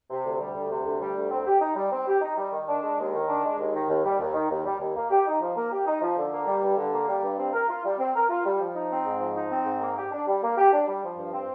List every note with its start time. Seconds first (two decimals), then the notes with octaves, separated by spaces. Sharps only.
0.10 C3
0.25 D2
0.39 G3
0.56 D2
0.71 C3
0.86 D2
1.01 G3
1.16 D2
1.31 C4
1.47 G4
1.61 D#4
1.76 G3
1.92 C4
2.08 G4
2.22 D#4
2.37 G3
2.52 D#3
2.67 D4
2.83 G#3
2.99 D#2
3.14 D#3
3.28 D4
3.44 G#3
3.59 D#2
3.73 D#3
3.88 D#2
4.04 G3
4.20 D#2
4.34 D#3
4.50 D#2
4.65 G3
4.80 D#2
4.96 A#3
5.11 G4
5.26 D#4
5.40 F3
5.56 A#3
5.71 G4
5.86 D#4
6.01 F3
6.17 D3
6.32 A#3
6.47 G3
6.63 G2
6.78 D3
6.93 A#3
7.08 G3
7.23 G2
7.38 C4
7.53 A#4
7.68 F4
7.84 G3
7.98 C4
8.15 A#4
8.29 F4
8.45 G3
8.59 F3
8.75 D#4
8.91 C4
9.05 G#2
9.20 F3
9.35 D#4
9.51 C4
9.65 G#2
9.81 A#3
9.97 G4
10.11 D4
10.26 G3
10.42 A#3
10.58 G4
10.72 D4
10.87 G3
11.03 F3
11.18 G2
11.33 C4